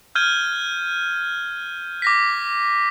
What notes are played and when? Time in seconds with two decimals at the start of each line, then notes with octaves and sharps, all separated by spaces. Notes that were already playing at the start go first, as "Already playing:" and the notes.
0.15 F6 G6 G#6 D#7 G7
2.02 D6 A#6 B6